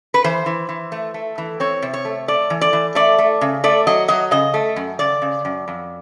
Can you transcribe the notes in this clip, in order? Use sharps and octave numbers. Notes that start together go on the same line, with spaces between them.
B4
E3 C5
E3
E3
A3
A3
E3
C4 C#5
C3
C#5
A3
A3 D5
E3
D5
E3
A3 D5
A3
C#3
A3 D5
F#3 D#5
F#3 D#5
C#3 D#5
A3
F#2
C#3 D5
C#3
F#2
F2